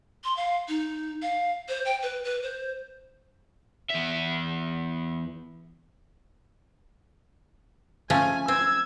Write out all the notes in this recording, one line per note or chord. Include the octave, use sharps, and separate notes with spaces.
C6
F5
D#4
F5
C5
G5
B4
B4
C5
E2 E5
F3 A3 C#4 G#5
C4 E6 G#6